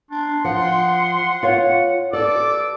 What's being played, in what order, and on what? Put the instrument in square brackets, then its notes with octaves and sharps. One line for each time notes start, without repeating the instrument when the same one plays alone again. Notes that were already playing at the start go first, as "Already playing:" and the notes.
[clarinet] D4 [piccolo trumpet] C6
[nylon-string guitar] F3 [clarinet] F#5
[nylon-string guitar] F4 C#5 F5
[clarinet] A4 [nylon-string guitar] D5 [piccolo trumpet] D6